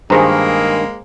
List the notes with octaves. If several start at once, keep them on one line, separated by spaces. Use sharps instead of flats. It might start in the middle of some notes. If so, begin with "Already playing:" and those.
G2 D#3 G#3 A#3 G#4 C5 A#5